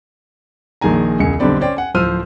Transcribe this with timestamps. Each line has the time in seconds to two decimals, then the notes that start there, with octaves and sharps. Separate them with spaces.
0.81 A#1 A#2 D#3 G#4 G#5 A#5
1.19 E1 C#2 G#4 C#7
1.39 B1 D3 G3 C4 D5 B5
1.61 C#4 C5 D5 G5
1.77 F#5 G#5
1.94 D1 F3 C5 E6 F6 D#7